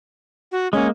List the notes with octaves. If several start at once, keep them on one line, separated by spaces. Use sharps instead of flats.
F#4
G#3 A#3 C#4